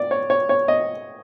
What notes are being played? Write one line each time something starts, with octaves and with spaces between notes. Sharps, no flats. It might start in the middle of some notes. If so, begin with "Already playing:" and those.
Already playing: D5
C#5
C#5
C#5
D#5